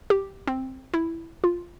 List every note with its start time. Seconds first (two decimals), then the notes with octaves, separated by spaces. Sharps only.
0.10 G4
0.47 C4
0.94 E4
1.44 F4